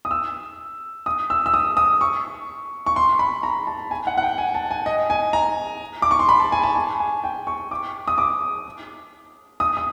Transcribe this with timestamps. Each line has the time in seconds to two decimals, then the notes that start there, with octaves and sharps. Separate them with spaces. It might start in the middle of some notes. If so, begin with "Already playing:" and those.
0.05 D#6
0.11 E6
1.06 D#6
1.30 E6
1.46 E6
1.54 D#6
1.77 D#6
2.01 C#6
2.86 C#6
2.96 C6
3.19 B5
3.43 A#5
3.67 A5
3.91 G#5
4.07 F#5
4.18 F#5
4.23 G5
4.38 G#5
4.54 A5
4.71 G#5
4.86 D#5
5.10 G#5
5.33 A#5
6.02 D6
6.11 C#6
6.19 C6
6.29 B5
6.40 A5
6.52 G#5
6.63 A5
6.75 G#5
7.00 G#5
7.24 G5
7.47 C#6
7.71 D6
8.08 D#6
8.18 D6
9.60 D#6
9.77 D#6